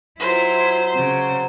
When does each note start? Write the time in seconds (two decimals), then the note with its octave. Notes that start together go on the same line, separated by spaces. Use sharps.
0.20 F#3 E4 F4 C5
0.95 C#3